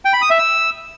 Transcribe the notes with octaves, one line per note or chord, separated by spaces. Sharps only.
G5
B5
D#6
E5
E6